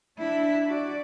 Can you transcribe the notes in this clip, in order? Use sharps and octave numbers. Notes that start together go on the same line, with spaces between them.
D4 E4
F#4 D5